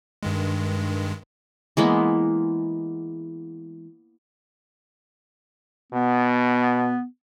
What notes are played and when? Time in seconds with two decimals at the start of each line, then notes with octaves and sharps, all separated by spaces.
0.23 G2 D#3 G#3
1.77 E3 G#3 A#3 B3
5.93 B2 B3